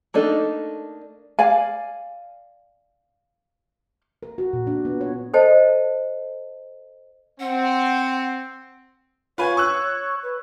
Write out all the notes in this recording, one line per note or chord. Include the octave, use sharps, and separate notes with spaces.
A3 A#3 D4 D#4 A4
D5 F5 G#5
A#4
F#4
A#2
D4
B3
C#5
A4 C5 D#5 G5 A5
C4 F#5
F4 B4 C#5 G#5
C#6 E6 F#6
B4